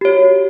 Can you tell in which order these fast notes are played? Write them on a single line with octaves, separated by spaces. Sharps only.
G4 C#5 F#4